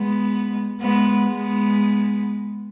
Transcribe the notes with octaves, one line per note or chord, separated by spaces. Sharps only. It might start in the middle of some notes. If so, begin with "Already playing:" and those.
Already playing: G#3 B3
G#3 B3
G#3 B3